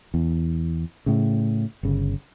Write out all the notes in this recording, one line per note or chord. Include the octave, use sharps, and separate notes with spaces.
E2
A2 C#3
G1 C#3